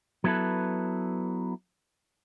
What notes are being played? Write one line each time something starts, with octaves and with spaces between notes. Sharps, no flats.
F#3 B3 E4 A4 B4